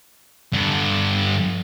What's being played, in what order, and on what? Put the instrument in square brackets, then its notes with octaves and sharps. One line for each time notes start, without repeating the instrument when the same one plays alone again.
[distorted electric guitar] G2 D3